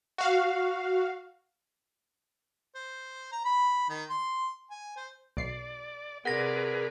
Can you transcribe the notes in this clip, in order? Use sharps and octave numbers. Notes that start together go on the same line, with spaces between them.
F#4 F5
C5
A#5
B5
D#3
C6
G#5
C5
B1 D5 C7
C3 G#4 A#4 B4 D5 F#5 A#6